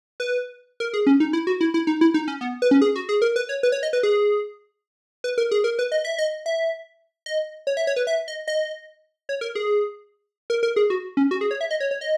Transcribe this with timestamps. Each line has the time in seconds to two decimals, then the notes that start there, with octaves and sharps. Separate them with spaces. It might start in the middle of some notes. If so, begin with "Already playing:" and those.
0.20 B4
0.80 A#4
0.93 G#4
1.07 C#4
1.20 D#4
1.33 E4
1.47 F#4
1.61 E4
1.74 E4
1.87 D#4
2.01 E4
2.14 D#4
2.28 C#4
2.41 B3
2.62 B4
2.71 C#4
2.82 G#4
2.96 F#4
3.09 G#4
3.22 A#4
3.36 B4
3.49 C#5
3.63 B4
3.72 C#5
3.83 D#5
3.93 B4
4.03 G#4
5.24 B4
5.38 A#4
5.51 G#4
5.64 A#4
5.79 B4
5.92 D#5
6.05 E5
6.18 D#5
6.46 E5
7.26 D#5
7.67 C#5
7.77 E5
7.87 C#5
7.96 B4
8.07 E5
8.28 D#5
8.48 D#5
9.29 C#5
9.41 A#4
9.55 G#4
10.50 A#4
10.63 A#4
10.76 G#4
10.90 F#4
11.17 C#4
11.31 F#4
11.41 G#4
11.51 C#5
11.61 E5
11.71 D#5
11.80 C#5
11.91 C#5
12.01 D#5